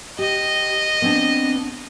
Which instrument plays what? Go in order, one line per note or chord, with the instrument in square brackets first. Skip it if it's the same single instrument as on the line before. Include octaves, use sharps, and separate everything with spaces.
[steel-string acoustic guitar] G4 [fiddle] D#5
[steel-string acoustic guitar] B3 C4 D4